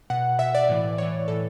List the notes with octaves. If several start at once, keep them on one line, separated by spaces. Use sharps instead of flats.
B2 F#5
B2 E5
D5
A2 E3
A2 E3 C#5
A2 E3 A4